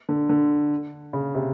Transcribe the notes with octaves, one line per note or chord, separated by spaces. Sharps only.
D3
D3
C#3
C3